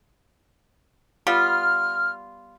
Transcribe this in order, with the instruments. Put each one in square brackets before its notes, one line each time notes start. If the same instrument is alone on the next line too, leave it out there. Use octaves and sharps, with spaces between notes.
[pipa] G3 B3 F4 [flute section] F6